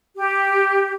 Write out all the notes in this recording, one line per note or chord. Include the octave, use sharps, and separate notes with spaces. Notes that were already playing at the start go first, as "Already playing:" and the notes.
G4